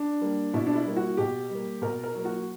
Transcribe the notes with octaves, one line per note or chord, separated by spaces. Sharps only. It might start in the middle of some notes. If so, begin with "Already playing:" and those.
Already playing: D4
G3 A#3
B2 E4
D4
E4
G3 A#3
F#4
B2 G4
G3 A#3
B2 A#4
A#4
F#3 A#3
F#4